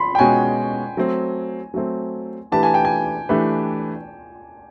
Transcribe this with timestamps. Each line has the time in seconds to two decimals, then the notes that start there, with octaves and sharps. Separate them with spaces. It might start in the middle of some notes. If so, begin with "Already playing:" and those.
Already playing: B5 C6
0.15 G5
0.19 B2 G#3 C#4 F#4 G#5
0.97 F#3 A3 C4
1.74 F#3 A3 C4
2.52 E3 A3 D4 G4 B4 A5
2.63 G#5
2.74 G5
2.85 G#5
3.29 E3 A3 D4 G4 B4